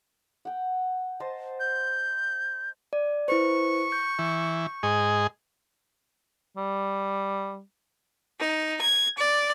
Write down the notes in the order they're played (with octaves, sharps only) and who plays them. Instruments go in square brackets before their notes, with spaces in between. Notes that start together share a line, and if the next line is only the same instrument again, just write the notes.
[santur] F#5 G5
C5 D#5 A5
[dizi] G6
[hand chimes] D5
[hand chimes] E4 B4 C5 [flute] C#6
[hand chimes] G6
[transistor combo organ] E3
G#2 G#4 D#5
[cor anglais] G3
[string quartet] D#4
G#6
D5